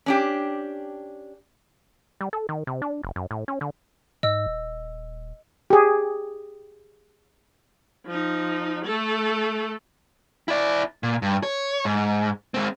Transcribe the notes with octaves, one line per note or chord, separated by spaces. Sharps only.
C#4 D4 G4
G3
A4
D#3
C3
D4
F#1
F#2
A2
C#4
D3
G#2 D#5 E6
D#1
G4 G#4
F3 D#4
A3 A4
E4 D5
A#2
G2
C#5
G#2
G#3 C4